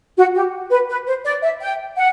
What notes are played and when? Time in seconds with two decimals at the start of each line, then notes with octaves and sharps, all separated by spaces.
0.17 F#4
0.35 G4
0.70 B4
0.89 B4
1.07 C5
1.25 D5
1.42 E5
1.61 G5
1.97 F#5